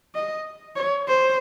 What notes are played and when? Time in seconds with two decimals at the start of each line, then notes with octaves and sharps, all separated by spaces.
0.15 D#5
0.76 C#5
1.07 C5